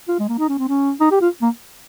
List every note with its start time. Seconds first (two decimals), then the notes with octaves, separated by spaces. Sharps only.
0.08 F4
0.19 G#3
0.29 A#3
0.39 D#4
0.49 C#4
0.59 C4
0.69 C#4
1.01 D#4
1.11 G4
1.22 F4
1.42 A#3